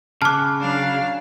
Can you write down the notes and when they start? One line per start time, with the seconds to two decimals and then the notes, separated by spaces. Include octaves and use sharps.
0.22 C#3 A5 D6 F6 F#6
0.59 F#3 D4 F5